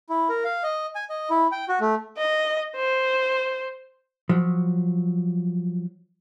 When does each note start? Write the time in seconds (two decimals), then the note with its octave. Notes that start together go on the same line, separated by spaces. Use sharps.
0.09 E4
0.29 A#4
0.44 F5
0.63 D#5
0.95 G#5
1.10 D#5
1.30 E4
1.52 G5
1.68 F#4
1.80 A3
2.17 D#5
2.76 C5
4.29 F3 F#3